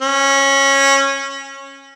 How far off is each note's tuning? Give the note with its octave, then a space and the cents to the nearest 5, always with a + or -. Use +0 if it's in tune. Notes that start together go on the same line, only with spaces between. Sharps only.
C#4 -15